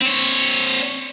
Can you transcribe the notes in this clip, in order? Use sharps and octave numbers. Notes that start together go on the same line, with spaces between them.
C4 C#5